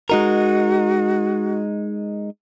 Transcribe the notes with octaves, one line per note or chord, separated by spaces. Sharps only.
G#3 D#4 F#4 A#4